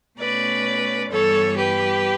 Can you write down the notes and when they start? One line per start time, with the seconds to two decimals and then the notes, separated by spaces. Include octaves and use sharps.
0.19 B2 A3 C#4 B4 D5
1.11 G2 E3 G3 B3 A4 C#5
1.57 G4 B4